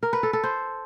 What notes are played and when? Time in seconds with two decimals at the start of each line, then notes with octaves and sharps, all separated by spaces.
0.03 A#4
0.13 B4
0.23 A4
0.33 A4
0.43 C5